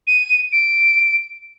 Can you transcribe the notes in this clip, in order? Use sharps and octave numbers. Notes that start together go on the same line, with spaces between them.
D#7
D7